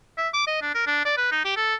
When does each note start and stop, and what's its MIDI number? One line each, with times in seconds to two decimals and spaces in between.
0.18 0.28 76
0.33 0.45 86
0.47 0.61 75
0.62 0.70 62
0.75 0.84 70
0.87 1.01 62
1.05 1.17 74
1.17 1.31 71
1.32 1.43 63
1.45 1.57 67
1.57 1.75 69